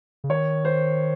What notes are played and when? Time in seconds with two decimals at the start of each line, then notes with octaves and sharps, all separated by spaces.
0.24 C#3
0.30 D#3 C#5
0.65 C5